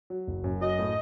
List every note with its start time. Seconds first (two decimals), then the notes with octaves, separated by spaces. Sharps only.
0.10 F#3
0.27 F#1
0.44 F#2
0.61 F#3 D#5
0.79 A2